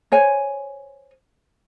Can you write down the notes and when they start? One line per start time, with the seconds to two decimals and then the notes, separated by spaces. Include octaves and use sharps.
0.12 C5 C#5 G#5